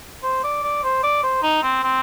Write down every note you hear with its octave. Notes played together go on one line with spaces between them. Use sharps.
C5
D5
D5
C5
D5
C5
D#4
C4
C4